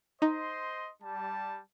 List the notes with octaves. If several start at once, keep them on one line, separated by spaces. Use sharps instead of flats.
D#4 C5 D#5 C6
G3 A5